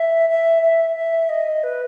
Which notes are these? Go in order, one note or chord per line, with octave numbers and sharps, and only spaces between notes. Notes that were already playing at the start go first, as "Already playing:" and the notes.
Already playing: E5
E5
E5
E5
D#5
B4